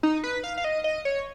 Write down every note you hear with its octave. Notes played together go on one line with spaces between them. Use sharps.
D#4
B4
F5
F5
D#5
D#5
C#5